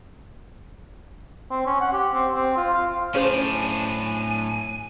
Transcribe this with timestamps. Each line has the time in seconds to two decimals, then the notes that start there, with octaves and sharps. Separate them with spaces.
1.50 C4
1.66 C#4
1.81 F#5
1.93 G4
2.13 C4
2.34 C4
2.57 F4
2.74 F5
3.15 A2 C#4 D4 G#4 C5 G#5